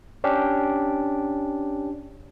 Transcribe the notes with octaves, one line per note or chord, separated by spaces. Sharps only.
C#4 D4 G4